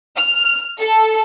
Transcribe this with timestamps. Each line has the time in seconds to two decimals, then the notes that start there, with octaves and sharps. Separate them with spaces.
0.16 F6
0.79 A4